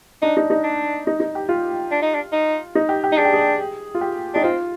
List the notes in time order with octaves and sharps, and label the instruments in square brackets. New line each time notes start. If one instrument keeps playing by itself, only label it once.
[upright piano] D4 [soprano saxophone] D#4
[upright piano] D#4
D#4
[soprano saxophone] D4
[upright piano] D#4
D#4
G4
F4
[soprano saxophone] D4
D#4
D4
D#4
[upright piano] D#4
G4
G4
[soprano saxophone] D#4
[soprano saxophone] D4 [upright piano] G#4
[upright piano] G4
G#4
F4
G4
[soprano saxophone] D4 [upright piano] D#4
[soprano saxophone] C4 [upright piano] F4